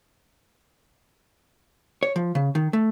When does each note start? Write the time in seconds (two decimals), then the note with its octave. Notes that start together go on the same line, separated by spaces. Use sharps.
2.03 C#5
2.16 F3
2.35 C#3
2.55 D#3
2.73 A3